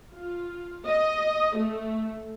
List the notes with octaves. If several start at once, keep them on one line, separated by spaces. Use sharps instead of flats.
F4
D#5
A3